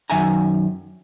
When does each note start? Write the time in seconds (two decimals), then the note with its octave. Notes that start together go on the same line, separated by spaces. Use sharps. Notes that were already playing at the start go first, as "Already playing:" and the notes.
0.10 F#2 D#3 E5 G#5 A#5